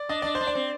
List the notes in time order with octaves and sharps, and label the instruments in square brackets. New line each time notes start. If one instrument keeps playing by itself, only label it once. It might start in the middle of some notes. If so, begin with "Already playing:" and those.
Already playing: [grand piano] D5
[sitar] D4 [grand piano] D#5
[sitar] D4 [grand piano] D5
[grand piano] C5
[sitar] D4
[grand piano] D5
[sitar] C4